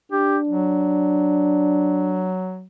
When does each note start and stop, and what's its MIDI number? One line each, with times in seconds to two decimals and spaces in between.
0.12 2.34 62
0.12 0.38 67
0.47 2.67 54